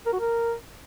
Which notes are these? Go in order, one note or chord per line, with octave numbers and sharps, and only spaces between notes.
A#4
F#4
A#4